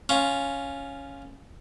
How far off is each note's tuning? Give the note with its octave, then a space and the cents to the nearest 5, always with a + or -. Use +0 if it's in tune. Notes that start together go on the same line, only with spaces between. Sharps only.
C#4 +0 F4 +0